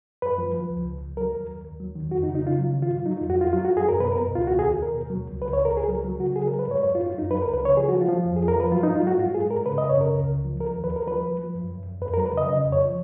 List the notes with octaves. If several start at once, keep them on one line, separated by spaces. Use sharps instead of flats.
F#2 B4
F3
F3
C#2
C#2
C#2
F#3 A#4
D#2
D#2
D#2
F#3
D#3
F2 F#4
D#4
C#3
D#4
C#3 F4
F#3
D#3
F4
G#2
F#3 D#4
F4
F2
F#4
F2 F4
F#3 F4
F#4
F#2
G#4
F#2 A#4
B2 B4
A#4
B2
C#2 F4
D#2 F#4
G#4
D#2
D#2 A#4
B2
F#3
C#2
C#2 B4
C#5
C#2
A#4
C#2 G#4
F#3 A#4
F#3
C#3 F#4
F#3 G#4
A#4
F#3
B4
G#2 C#5
F#2 C#5
F4
F#2
F4
F#2 D#4
F#3 B4
A#4
C#2
B4
C#3 C#5
F3 G#4
F#4
F3
F4
F3
F2
G#4
F2
A#4
F3 B4
F#3 F4
D#4
G#2
F4
F#3 F#4
G#2 F4
G#2 G#4
G#2 A#4
C#3 B4
D#5
F#2
C#5
C#3 A#4
C#2
C#2
F3
F3 A#4
D#2
B4
D#2 A#4
F3 B4
F3
F3
F#2
F#2
F#2
F2 B4
A#4
F#3
B4
C#3 D#5
C#3 D#5
F2
C#5
F3